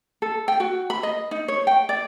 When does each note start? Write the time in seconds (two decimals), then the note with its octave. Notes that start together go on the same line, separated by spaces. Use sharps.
0.22 A4
0.48 G5
0.60 F#4
0.90 B5
1.03 D#5
1.31 D#4
1.48 C#5
1.67 G5
1.89 D5